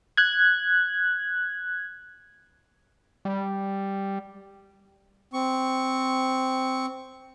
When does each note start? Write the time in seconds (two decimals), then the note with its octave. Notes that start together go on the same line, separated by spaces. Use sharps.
0.17 F#6 G#6
3.25 G3
5.33 C4 C#6